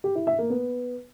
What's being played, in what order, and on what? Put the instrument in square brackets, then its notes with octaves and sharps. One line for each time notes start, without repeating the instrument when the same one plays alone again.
[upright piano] G4
E4
E5
A#3
B3